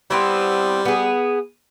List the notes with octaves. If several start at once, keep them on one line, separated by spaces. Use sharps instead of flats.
G3 B3 C4 E4
B3 G#4